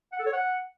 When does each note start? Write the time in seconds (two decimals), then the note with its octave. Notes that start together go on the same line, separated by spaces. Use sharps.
0.13 F#5
0.19 A4
0.26 C#5
0.33 F#5